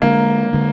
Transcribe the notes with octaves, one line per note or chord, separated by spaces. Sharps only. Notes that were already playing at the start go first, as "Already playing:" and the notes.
D3 G#3 A#3 D4
D3 G#3 D4